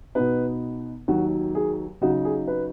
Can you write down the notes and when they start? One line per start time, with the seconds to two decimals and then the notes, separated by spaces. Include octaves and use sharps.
0.15 B2 B3 D#4 B4
1.08 D#2 D#3 F#3 F#4
1.55 G#4
2.01 C#3 F#3 D#4 F#4
2.25 G#4
2.48 B4